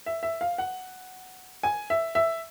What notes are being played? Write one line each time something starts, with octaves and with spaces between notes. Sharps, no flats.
E5
E5
F5
F#5
G#5
E5
E5